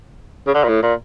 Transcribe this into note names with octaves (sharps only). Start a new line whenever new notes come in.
C#3
D3
A#2
A2
A#2